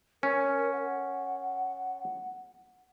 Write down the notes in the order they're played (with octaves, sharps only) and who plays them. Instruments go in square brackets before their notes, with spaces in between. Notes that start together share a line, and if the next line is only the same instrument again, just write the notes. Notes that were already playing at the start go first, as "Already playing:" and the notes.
[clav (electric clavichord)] C#4 [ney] A#4
[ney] F#5